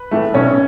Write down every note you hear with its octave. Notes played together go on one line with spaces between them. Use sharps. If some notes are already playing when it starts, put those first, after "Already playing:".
Already playing: B4
A2 E3 A3
B1 C#4 C#5